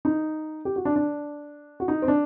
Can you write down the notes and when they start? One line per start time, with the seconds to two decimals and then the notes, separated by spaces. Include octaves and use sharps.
0.05 D#4
0.65 G4
0.76 F#4
0.85 D4
0.96 D4
1.80 F#4
1.88 D#4
2.02 C4
2.08 D4